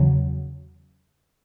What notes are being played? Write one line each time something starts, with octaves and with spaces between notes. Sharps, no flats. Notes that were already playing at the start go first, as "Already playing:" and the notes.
Already playing: E2 C#3 F#3